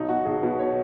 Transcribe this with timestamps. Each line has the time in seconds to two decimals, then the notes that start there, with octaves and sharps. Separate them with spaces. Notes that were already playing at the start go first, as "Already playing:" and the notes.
Already playing: B1 D#4
0.09 B2 F#4
0.25 B1 G#4
0.42 B2 B4
0.59 C#5